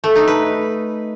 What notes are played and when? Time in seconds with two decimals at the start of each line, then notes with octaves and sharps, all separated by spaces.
0.04 A3
0.16 D#4
0.27 B4